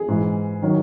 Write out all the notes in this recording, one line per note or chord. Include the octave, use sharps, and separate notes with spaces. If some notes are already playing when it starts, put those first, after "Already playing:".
Already playing: G#4
G#2 E3
D#3 F#3